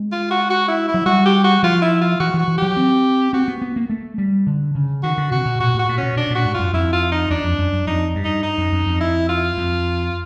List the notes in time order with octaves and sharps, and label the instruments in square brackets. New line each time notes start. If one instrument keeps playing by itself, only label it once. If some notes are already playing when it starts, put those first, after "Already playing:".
Already playing: [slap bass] G#3
[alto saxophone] F4
F#4
F#4
E4
E4
[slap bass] F#3
[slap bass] G3 [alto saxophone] F#4
[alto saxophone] G4
F#4
[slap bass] F3 [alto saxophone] F4
[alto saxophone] E4
F4
[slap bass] E3 [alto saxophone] F#4
[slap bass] E3
[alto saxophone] F#4
[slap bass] E3
[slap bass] F#3 [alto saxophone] G4
[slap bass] C4
[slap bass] C4 [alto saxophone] F#4
[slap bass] B3
B3
A#3
A3
G3
D3
C#3
[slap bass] D#3 [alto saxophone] F#4
[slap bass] D3
[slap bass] C3 [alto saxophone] F#4
[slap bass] B2
[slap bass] A#2 [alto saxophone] F#4
[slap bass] A2
[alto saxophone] F#4
[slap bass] A#2
[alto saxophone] C#4
[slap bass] B2
[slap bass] B2 [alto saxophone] D4
[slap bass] A#2 [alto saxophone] F#4
[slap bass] G#2
[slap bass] F#2 [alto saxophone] F4
[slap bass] F2 [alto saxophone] E4
[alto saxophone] F4
D#4
[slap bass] E2 [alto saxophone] D4
[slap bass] F2
F#2
F#2
[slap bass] F2 [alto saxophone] D#4
[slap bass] G2
[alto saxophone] D#4
D#4
[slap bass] F#2
F#2
F2
[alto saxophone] E4
F4
[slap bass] F2